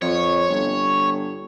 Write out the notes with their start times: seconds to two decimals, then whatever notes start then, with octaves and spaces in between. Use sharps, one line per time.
0.02 F2 C#5
0.49 G1